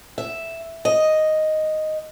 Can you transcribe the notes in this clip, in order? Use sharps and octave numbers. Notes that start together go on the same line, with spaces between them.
E5
D#5